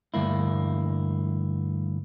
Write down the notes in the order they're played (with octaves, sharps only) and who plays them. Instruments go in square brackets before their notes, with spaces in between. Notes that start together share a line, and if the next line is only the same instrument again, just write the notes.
[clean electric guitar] D2 G2 A#3 E4